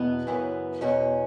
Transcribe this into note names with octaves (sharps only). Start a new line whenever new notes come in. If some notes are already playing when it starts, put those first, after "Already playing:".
Already playing: E2 B2 B3
F#2 C#3 E3
E2 B2 C#4